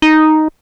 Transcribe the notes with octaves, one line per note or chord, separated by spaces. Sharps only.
D#4